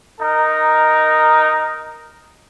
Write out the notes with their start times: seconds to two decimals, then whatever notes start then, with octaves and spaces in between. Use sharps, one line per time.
0.19 D#4 A#4